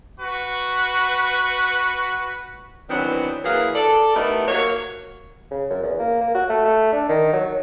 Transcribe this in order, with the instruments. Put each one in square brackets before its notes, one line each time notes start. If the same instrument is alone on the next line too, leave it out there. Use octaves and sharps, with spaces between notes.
[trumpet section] F#4 B4
[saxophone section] D#3 E3 F#3 B3 C4 D4
E3 F#3 A#3 G#4 B4 F5
A4 D5
A3 B3 D#4 E4 G4 A#4
F#3 A#3 C#5
[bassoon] C#3
F#2
E2
A#3
A#3
F#4
A3
A3
D4
D#3
F#3